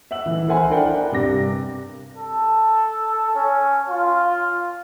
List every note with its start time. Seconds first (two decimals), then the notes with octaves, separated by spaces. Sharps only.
0.11 E5 F#5 E6 F#7
0.26 E3
0.48 A#4 C5 E5 F#5 G#5 B5
0.70 D4 A#4 D5 F#5 G5
1.12 G2 C3 D6 A#6
2.17 A4
3.35 C#4
3.89 F4